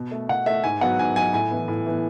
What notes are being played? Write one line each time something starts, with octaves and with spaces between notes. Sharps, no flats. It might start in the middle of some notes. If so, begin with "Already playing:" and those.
Already playing: B2
A3
B2 F#5
A3 E5
G#2 G#5
F#3 B3 F#5
G#2 G#5
F#3 B3 G#5
A2 G#5
E3 B3
A2
E3 B3